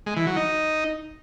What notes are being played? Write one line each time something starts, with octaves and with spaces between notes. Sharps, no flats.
G#3
E3
F#3
D#4